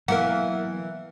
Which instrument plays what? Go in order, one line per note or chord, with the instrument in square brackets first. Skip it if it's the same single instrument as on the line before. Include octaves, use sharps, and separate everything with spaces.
[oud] E3 A#3 [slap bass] F#3 B3 [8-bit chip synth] A#4 F#5